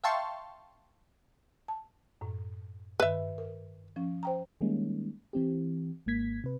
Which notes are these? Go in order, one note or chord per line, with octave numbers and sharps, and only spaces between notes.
E5 F5 G5 A5 C6 C#6
A5
F#2 A2
G2 D#3 B4 E5
A#4
F3 C#4
C5 G5 A#5
D#3 G3 G#3 A#3 C#4 D#4
E3 C4 G4
G#1 G#2 A#3 G#6 B6
C3 B4